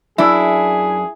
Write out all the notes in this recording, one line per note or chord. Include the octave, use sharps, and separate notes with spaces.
F#2 D4 E4 G#4